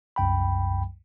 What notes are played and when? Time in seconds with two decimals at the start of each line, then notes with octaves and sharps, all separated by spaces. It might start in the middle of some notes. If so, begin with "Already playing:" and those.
0.16 C2 F#2 G5 B5